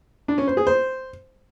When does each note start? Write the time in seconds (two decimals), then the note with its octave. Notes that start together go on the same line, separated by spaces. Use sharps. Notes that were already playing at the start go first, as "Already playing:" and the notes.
0.28 D4
0.38 C#4
0.48 C5
0.57 G#4
0.67 C5